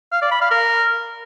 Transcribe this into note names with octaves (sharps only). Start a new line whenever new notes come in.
F5
D5
B5
F5
A#4